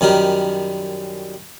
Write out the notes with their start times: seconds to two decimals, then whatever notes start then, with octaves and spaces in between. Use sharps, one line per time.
0.01 F#2 D#3 G3 A#4